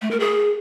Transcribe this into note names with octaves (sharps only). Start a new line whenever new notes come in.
A3
A#4
G#4